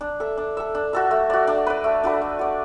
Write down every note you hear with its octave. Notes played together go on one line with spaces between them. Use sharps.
D4
A4 E5
D4
A4 E5
D4
F#4 A4 E5
A3
F#4 D5
D4
B4 D5
A3
D4 F#4 B4
A3
F#4 D5